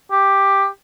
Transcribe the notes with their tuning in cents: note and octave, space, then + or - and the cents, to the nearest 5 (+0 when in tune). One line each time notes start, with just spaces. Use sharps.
G4 +5